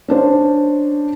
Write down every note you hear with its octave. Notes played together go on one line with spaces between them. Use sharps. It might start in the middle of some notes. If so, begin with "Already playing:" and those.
C#4 D4 C5